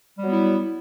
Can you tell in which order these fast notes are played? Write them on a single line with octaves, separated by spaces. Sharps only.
G3 F#3 B3 E4